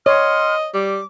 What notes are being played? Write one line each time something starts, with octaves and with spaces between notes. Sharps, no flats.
C#5 D#5 F#5 C6 F6
G3 D6